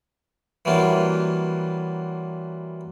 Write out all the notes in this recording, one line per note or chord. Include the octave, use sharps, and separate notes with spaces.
E3 F#3 G3 A#3 F4